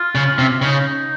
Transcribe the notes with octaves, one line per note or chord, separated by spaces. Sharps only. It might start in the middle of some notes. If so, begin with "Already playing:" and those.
Already playing: F4
C#3
C3
C#3 D#4